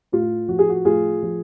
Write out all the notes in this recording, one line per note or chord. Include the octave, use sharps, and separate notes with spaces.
A2 F4
F3 F#4
G#4
F#4
A2 F4 G#4
F3